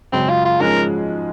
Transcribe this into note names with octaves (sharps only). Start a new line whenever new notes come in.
F#2 C#3 G#3 C4
F4
F4
G#2 F3 G#3 C#4 G#4 A#4